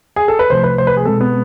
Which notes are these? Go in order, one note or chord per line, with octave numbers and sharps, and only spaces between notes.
G#4
A4
B4
C2 C3 F3 A3 C5
B4
C5
B4
G#4
B2 G#3 C4 A4
B3